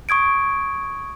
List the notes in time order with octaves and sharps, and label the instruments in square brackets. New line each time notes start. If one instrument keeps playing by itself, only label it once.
[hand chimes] C#6 D#6 G#6 D7